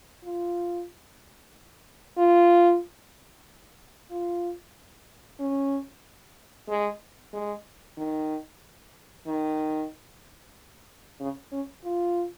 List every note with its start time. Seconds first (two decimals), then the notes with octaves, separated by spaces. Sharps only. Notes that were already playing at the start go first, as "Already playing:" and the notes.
0.24 F4
2.17 F4
4.11 F4
5.40 C#4
6.69 G#3
7.33 G#3
7.98 D#3
9.27 D#3
11.20 C#3
11.52 C#4
11.84 F4